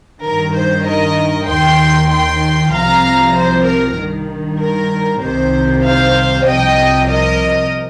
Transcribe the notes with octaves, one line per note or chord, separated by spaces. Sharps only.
G2 D#3 A#4
C5
A#4 D#5
D#2 D#3 G5 C6
G5 C6
C2 C3 F3 F5 A#5
C5
A#4
G2 D#3
A#4
C2 C3 D#3 C5
C5 F5
C2 C3 F3 D#5 G5
A#4 D#5